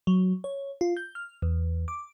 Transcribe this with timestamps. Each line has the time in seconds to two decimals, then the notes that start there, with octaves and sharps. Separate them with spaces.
0.07 F#3
0.44 C#5
0.81 F4
0.97 G6
1.15 F6
1.42 E2
1.88 D6